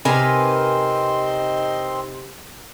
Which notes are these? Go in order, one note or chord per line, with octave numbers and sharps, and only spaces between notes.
C3 C4 D#4 A#4 B4 G#5 C6